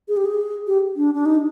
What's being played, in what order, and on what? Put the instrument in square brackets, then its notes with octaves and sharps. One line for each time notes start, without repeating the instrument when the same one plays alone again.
[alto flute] G#4
G4
G#4
G4
D4
D4
D#4